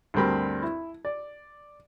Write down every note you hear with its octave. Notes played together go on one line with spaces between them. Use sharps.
D2 G2 G3 C4 A#4 B5
E4
D5